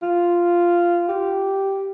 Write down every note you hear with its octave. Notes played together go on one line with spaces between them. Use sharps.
F4
G4